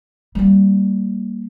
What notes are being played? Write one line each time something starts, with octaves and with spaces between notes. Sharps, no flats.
G3 A#3